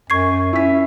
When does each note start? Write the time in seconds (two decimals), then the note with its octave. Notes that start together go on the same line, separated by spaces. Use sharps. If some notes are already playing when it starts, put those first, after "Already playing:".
0.10 F#2 C#6 G#6 C7
0.53 C#4 E4 B6